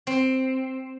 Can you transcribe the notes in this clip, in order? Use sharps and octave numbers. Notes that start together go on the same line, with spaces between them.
C4